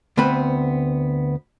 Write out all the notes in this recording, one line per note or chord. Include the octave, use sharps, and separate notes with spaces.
D2 B3 C4 B4